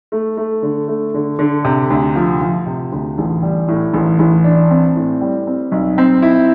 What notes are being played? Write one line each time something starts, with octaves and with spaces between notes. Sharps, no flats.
A3
A3
D3
A3
D3
D3
C3
D2
F3
F3
C3
D2
A1
G3
A2
A1
A1
D4
C4
A2
G3
C4
B1
C4
E4